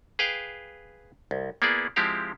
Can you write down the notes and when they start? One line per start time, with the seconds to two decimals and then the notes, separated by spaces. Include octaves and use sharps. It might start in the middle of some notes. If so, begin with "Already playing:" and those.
0.19 G#4 B4 F5 G5
1.31 C2
1.62 A#3 B3 E4 G#4 D5
1.96 F3 G#3 C4 E4 G4 F5